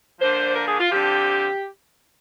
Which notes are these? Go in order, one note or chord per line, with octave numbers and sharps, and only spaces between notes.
D3 F3 A#3 D4 C5
A#4
G#4
F4
D3 F3 C4 G4